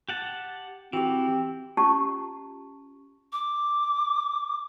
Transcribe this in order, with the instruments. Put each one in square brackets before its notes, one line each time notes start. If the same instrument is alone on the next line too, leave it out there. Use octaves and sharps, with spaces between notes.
[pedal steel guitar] G4 F#5 A5
[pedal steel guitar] E3 [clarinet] C4 [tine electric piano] F#4 G4
[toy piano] C#4 F4 G4 A5 A#5 C#6
[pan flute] D6